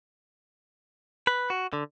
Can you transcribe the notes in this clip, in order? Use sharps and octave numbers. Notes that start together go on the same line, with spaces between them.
B4
F#4
D3